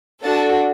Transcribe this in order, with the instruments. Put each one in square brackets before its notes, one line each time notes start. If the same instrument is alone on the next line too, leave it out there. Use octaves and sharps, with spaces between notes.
[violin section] D4 F#4 A4 A5